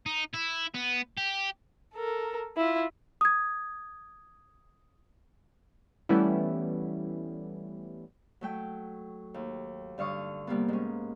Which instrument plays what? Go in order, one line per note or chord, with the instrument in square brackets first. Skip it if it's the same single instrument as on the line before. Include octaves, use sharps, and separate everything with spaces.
[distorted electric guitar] D#4
E4
B3
G4
[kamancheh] A4 A#4
E4 F4
[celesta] D#6 G#6
[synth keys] E3 G3 A3 B3 C#4 E4
[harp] F#3 A3 G5
D#2
G2 D3 F5 C#6 D#6
C3 G3 A#3 B3
G#2 C#4